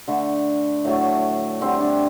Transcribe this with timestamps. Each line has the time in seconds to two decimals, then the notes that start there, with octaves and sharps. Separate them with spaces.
0.08 D3 A3
0.85 A2 F#3 A3
1.61 D3 G3 C4
1.81 D4